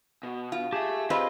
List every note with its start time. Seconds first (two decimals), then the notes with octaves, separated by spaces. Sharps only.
0.23 B2
0.52 F4
0.73 G4 G#4 E5 A5
1.10 C4 F4 B4 D#5